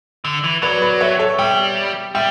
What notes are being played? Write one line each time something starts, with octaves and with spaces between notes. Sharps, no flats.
D3
E3
F#3 B4 D5
B4 D5
C#5 E5
A4 C#5
G3 E5 G5
G3 E5 G5